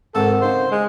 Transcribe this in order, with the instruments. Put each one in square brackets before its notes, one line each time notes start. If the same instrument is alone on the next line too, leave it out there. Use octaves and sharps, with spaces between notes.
[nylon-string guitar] G#2 [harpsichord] C3 D#3 F#4 [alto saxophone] A4
[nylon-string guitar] C#3 D#4 F5 [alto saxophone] C5
[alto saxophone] G#3